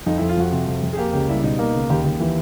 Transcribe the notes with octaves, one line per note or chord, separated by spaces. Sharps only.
F2 D#4
E4
F2
F4
F3 F#4
C3
F2
F2
G#4
A#3 G4
C#2 G4
G3 E4
B2 D#4
A#3
C#2
D#2 G4
D#2
E3